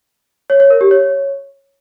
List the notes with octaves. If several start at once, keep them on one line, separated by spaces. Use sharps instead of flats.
C#5
C#5
A#4
G4
C#5